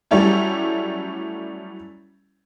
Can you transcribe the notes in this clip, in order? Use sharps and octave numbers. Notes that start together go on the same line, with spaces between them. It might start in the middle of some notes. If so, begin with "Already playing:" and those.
F#3 G3 A3 C#4 E4 G4